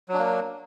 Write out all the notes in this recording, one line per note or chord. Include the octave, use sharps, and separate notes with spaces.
F#3 A#3 D4